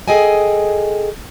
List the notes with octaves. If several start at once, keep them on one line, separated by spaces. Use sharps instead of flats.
G#4 A4 D#5 G5 G#5